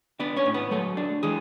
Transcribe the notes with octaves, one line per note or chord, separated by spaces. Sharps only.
B3 D4 B4
C#4 C#5
A2
B3 B4
F#3 A3 A4
D4
E3 G#3 G#4